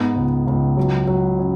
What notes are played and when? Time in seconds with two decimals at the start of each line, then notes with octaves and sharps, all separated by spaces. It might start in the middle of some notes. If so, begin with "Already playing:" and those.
Already playing: G#2 B3
0.16 C#2
0.47 C#2
0.77 F#3
1.07 F#3
1.39 C#4